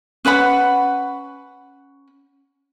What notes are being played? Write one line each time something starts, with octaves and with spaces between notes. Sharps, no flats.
C#4 B4 F#5 B5